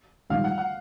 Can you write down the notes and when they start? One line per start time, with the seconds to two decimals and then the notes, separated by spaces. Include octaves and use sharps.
0.30 A#1 G#2 D#3 G3 F5
0.44 F#5
0.58 F#5